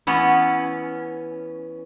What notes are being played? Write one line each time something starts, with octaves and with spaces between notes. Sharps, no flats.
E3 B3 C#4